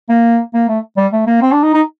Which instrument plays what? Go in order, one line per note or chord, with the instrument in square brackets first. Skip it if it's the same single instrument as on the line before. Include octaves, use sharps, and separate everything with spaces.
[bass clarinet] A#3
A#3
A3
G3
A3
A#3
C4
D4
D#4
D#4